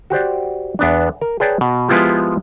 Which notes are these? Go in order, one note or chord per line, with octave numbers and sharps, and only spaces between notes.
F#4 G4 C5 D5
E2 B3 D4
A#4
G#4 B4 C#5 D5 G5 A5
B2
F3 G#3 B3 E4 F4 G4